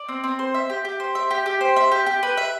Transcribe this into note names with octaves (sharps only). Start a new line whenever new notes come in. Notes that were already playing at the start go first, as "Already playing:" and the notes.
Already playing: D5
C4
C4
C5
E5
G4
G4
C5
E5
G4
G4
C5
E5
G4
G4
B4
E5